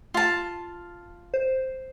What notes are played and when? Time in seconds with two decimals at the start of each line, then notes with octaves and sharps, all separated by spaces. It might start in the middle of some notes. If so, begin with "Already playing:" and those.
0.14 F4 A5
1.34 C5